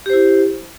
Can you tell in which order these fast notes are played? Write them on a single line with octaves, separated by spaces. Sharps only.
G4 C5 E4